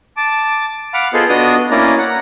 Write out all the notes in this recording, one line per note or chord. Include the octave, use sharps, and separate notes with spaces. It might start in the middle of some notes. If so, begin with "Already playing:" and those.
A5 D6
F5 F#5 B5 D6 F6
B3 F4 G#4 A4 C5 D#5
B3 D4 F#4 D#5 D#6
A#3 C#4 E4 D5 A#5
F#5 A#5